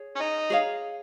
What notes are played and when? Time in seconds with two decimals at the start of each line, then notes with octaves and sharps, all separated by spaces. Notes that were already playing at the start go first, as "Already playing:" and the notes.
Already playing: G#4 C#5
0.16 C#4
0.20 D#4
0.50 G#4 C#5 F5